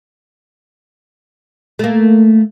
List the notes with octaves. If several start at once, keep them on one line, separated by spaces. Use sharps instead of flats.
A3 A#3